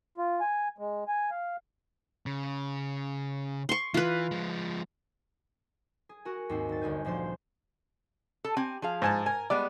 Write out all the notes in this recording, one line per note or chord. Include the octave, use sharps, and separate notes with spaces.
F4
G#5
G#3
G#5
F5
C#3
C6 C#6
E3 F4 B4
F3 G#3
G#4
F#4 A#4 G#5
D#2 G#2 C4
D#1 A6
G1 D2 G#5 G6
D2 A#2 F3 C5 C6 G6
A4
C4 G4 G#5
F3 G#4 F5
G#2 G#5 A5
A#4 G#5
G3 G#3 B3 D5